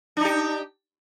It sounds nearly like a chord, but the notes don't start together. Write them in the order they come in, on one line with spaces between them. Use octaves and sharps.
D4 D#4 G4